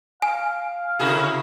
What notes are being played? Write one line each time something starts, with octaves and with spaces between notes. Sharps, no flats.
F5 G#5
C3 E4 F#4 G#4 A#4